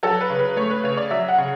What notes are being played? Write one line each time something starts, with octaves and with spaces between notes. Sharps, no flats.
F#3 A4
B4
C#3
B4
A3 C#5
B4
C#3 C#5
D5
F#3 E5
F#5
C#3